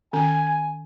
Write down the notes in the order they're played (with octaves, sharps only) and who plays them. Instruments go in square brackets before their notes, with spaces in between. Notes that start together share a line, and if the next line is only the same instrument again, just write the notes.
[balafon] D#3 C#4 [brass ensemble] G#5